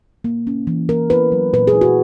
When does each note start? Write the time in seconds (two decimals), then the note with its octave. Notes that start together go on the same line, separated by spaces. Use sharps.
0.24 A#3
0.47 C#4
0.67 E3
0.89 A#3 A#4
1.10 E4 B4
1.32 F#3
1.53 A#2 B4
1.67 G#4
1.75 E4
1.81 F#4